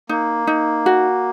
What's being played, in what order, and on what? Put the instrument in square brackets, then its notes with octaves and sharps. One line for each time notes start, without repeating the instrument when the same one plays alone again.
[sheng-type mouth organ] A#3 [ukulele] D#4
[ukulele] D#4
F#4